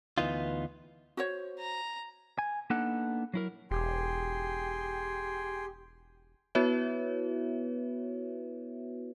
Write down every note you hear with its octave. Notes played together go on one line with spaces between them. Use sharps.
D2 E3 B3 D#4 F4
F#4 C5 C#5
A#5
G#5
A#3 B3 D4 D#4 A4 F#5
F#3 E4 A#4
E1 G4 G#4 G5 C6
B3 E4 F#4 B4 C#5 E5